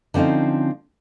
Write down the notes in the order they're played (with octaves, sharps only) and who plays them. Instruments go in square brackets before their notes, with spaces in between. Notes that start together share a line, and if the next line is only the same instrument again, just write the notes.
[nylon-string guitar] D3 F3 C4 C#4 D#4